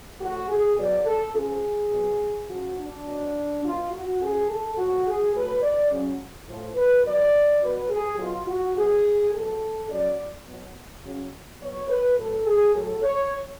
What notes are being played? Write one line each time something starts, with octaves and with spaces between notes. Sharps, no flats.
A2 F3 F#4
G#4
B2 F#3 D5
A4
C#3 F3 G#4
B2 F#3
C#3 F3 F#4
D4
B2 F#3
B2 F#3 F4
F#4
C#3 F3 G#4
A4
A2 F3 F#4
G#4
A2 F#3 B4
D5
C#3 F#3
A2 F3
B4
B2 F#3 D5
B2 F#3 B4
G#4
B2 F#3 F4
F#4
B2 F#3 G#4
B2 A4
F#3
C#3 F#3 D5
B2 F#3
C#3 F#3
B2 F#3 C#5
B4
A2 F#3 A4
G#4
A2 F#3 A4
C#5